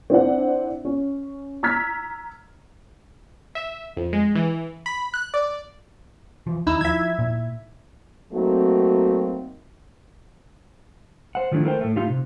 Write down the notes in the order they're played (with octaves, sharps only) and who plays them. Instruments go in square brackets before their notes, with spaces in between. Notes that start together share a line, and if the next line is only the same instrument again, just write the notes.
[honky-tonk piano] C4 D4 E4 F#5
C#4
A#5 E6 F6 G#6 B6
[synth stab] E5
F2
G#3
E3
B5
F#6
D5
[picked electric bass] E3 F3
[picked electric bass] D#2 [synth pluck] D#4 E4 E6
[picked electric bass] F3 [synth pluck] E5 G#6
[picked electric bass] A#2
[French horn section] F#3 A3 A#3 C4 D#4 F#4
[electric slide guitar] C5 F#5
D#3 F3 A3 D4 E4
A3 A#4 C5 G5
A2 A3
A2 D#4 F4 G4
C3